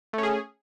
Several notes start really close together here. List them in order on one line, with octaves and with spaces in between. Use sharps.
A3 C#4 G#4